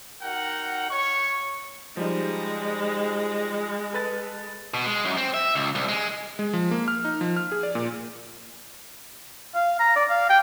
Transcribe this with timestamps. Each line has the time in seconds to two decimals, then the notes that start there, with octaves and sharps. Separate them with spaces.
0.22 D#4 F#4 A#4 F#5 G5
0.90 C#5 C#6
1.97 F3 G3 G#3 D#4
3.93 A4 B4 A6
4.74 B2
4.86 G#3
5.05 F#2
5.18 C4
5.34 E5
5.55 C#2
5.75 C2
5.89 G#3
6.39 G#3
6.53 F3
6.71 A#3
6.88 F6
7.05 D#4
7.21 F3
7.36 F6
7.52 G#4
7.63 D5
7.75 A#2
9.55 F5
9.80 A#5
9.96 D5
10.10 F5
10.29 G5